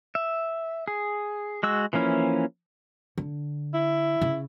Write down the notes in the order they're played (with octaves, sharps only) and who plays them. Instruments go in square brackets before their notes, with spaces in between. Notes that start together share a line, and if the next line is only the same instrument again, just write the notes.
[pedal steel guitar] E5
G#4
G#3 F#4 E6
E3 F3 A#3 C#4 E4
[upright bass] D3
[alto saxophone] E4
[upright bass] C#3